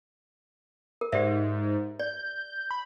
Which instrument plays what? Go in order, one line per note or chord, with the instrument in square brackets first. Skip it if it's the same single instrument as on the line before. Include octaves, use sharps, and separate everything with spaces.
[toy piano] A#4
[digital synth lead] G#2 [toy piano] G4 D5 E5
[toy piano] D5 [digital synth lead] G6
[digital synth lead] B5